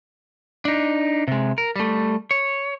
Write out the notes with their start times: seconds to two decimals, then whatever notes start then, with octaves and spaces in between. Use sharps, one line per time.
0.65 D4 D#4
1.28 C3 G#3
1.58 A#4
1.76 G3 A3
2.31 C#5